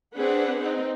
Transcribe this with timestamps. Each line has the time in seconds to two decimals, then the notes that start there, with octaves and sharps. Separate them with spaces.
0.14 C4 D4 G#4 B4 F#5
0.61 C4 D#4